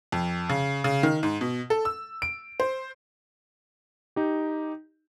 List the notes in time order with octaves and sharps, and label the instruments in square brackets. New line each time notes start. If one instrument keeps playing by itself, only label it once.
[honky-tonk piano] F2
C#3
C#3
D#3
G#2
B2
A4
E6
D7
C5
[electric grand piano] D#4 G4